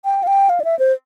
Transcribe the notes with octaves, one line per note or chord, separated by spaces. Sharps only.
G5
F5
G5
F5
D5
E5
C5